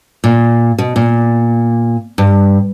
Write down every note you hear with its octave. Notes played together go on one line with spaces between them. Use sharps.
A#2
B2
A#2
G2